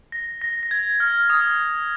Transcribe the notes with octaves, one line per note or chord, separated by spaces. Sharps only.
A#6
A#6
A#6
G#6
F6
D#6